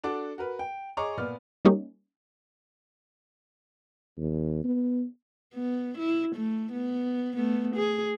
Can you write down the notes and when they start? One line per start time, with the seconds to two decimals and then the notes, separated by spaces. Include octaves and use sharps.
0.04 D4 F#4 A4 D6
0.38 F#4 A#4 B4
0.59 G5
0.97 G#4 C#5 D#5 A#5 C#6 D6
1.17 A#2 B3 D5 F6
1.65 G3 A#3 C#4 D#4 G4
4.18 D#2
4.64 B3
5.55 B3
5.98 E4
6.36 A3
6.73 B3
7.37 A3 B3
7.76 G#4